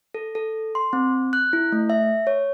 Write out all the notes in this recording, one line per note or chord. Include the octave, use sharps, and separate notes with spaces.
A4
A4
C6
C4
F#6
E4
A3
E5
C#5